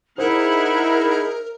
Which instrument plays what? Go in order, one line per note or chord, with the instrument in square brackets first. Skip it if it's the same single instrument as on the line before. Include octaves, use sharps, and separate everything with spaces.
[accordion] D#4 E4 G#4 [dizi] A#4 [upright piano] C5 [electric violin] E5 F#5